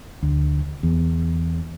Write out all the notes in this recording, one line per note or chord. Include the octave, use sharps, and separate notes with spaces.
D2
E2